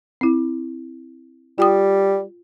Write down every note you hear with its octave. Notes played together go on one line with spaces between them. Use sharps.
C4 E4
G3 F4 G5 D#6